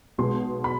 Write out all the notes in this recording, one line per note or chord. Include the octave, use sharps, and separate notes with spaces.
B1 B2 G#3 B3 C6
B5